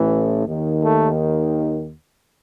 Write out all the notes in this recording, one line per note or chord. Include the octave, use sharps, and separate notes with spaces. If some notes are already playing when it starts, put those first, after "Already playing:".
Already playing: A1 A2 E3
D#2 D#3
A3